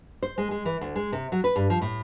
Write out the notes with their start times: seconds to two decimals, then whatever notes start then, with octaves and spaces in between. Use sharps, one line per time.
0.23 C5
0.38 G#3
0.51 G#3
0.65 E3
0.81 D2
0.96 G#3
1.12 C3
1.32 F#3
1.44 B4
1.56 G2
1.70 F3
1.82 A2